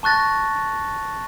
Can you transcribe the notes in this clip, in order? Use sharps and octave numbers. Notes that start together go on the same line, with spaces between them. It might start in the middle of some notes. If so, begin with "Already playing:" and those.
A5 C#6 F#6 A6 A#6